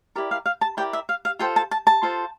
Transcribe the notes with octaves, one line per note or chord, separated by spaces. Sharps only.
E4 G4 A#4 D5
F5
F5
A5
E4 G4 A#4 D5 G5
E5
F5
F5
F4 A4 C5 G5
A5
A5
A5
F4 A4 C5